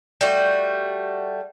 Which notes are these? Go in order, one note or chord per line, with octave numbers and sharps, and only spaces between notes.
G3 A3 F#4